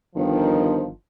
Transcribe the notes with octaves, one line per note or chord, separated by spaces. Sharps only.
G1 D#3 F3